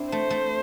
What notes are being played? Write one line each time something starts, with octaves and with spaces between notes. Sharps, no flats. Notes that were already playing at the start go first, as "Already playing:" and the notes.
Already playing: C4 D4 E4
A3 C5
A3